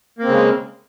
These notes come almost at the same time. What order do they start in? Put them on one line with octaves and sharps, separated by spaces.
A#3 C4 C#3 G#3